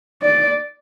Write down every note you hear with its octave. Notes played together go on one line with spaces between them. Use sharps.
D5